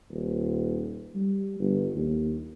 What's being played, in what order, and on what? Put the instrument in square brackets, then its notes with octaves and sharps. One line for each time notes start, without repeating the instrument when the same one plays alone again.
[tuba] D#1
G3
G1
D#2